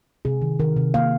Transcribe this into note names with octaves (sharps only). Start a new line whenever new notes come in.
C3 G#4
D#3
D#3 A#4
C3
A#3 F5